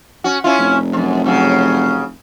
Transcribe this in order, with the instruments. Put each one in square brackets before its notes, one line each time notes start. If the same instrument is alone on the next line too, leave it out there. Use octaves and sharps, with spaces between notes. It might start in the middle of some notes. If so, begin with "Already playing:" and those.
[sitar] C#4 F#4
C#4 E4 F4
[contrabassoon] F1
[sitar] F#2 C3
C#3 F#3